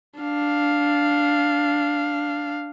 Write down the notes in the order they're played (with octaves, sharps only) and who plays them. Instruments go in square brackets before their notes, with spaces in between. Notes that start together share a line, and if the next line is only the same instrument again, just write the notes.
[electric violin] D4 F5